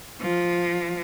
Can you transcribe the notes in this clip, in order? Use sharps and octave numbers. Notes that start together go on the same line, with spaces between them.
F3